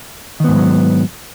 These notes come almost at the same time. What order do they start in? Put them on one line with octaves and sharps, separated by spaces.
D#3 B3 G#2 F3 F#3